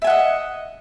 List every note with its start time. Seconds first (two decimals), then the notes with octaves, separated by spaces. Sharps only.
0.02 E5
0.04 G#5
0.07 F#5
0.10 D#5